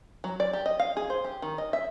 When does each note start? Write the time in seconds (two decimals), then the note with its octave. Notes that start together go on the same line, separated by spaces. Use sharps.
0.24 F#3
0.40 D5
0.53 G4
0.66 D#5
0.79 F5
0.97 G#4
1.10 C5
1.24 G4
1.42 D#3
1.58 D#5
1.73 E5